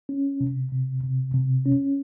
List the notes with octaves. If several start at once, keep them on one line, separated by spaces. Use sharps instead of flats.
C#4
C3
C3
C3
C3
C#4